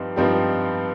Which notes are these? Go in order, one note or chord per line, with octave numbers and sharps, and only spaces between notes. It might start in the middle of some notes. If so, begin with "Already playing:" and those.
Already playing: G2 F3 C4 D#4 G4
G2 F3 C4 D#4 G4